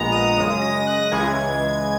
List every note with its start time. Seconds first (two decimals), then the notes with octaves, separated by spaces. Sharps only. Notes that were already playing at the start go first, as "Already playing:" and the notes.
Already playing: A#1 A#2 G#3 B3 A#5
0.12 D#6
0.37 F#2 C#3 G#3 D#6
0.62 A#6
0.87 F#6
1.12 C#2 C#3 E3 G#3 G#6
1.49 G#6